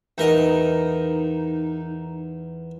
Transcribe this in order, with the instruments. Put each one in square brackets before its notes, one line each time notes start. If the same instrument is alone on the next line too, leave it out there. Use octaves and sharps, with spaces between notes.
[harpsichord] E2 A#4 D#5 [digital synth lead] D#4